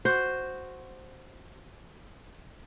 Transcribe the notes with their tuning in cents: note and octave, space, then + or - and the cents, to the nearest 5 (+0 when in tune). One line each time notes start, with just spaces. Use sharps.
F#4 +0 C5 +0